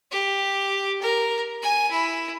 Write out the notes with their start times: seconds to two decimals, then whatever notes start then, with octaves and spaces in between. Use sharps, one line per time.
0.11 G4
1.02 A#4
1.62 G#5
1.91 E4